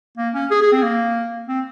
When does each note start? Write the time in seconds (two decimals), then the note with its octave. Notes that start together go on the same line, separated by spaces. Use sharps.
0.17 A#3
0.34 C#4
0.51 G#4
0.62 G#4
0.72 C4
0.83 A#3
1.48 C4